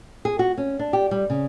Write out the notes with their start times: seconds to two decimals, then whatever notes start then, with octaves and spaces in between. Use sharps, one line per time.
0.25 G#4
0.39 F#4
0.58 C#4
0.79 D4
0.93 G4
1.11 G3
1.30 C#3